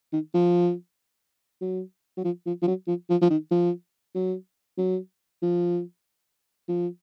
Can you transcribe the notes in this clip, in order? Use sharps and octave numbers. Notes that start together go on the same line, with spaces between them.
D#3
F3
F#3
F#3
F3
F3
F3
F#3
F3
F3
F3
D#3
F3
F#3
F#3
F3
F3